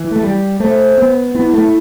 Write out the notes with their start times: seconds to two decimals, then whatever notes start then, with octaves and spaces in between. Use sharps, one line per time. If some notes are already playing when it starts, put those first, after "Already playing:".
Already playing: E3
0.11 A3
0.23 G3
0.60 A3 C5
0.98 B3
1.35 B3 E4
1.53 A3